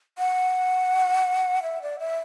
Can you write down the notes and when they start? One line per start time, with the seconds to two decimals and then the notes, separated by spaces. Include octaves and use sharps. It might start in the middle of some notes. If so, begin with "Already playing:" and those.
0.18 F#5
1.63 E5
1.82 D5
1.99 E5